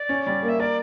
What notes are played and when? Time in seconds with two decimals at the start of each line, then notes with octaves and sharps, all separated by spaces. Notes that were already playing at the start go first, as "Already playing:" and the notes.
Already playing: D5
0.09 C#4
0.27 G3
0.43 A#3
0.49 E5
0.60 A#4 D5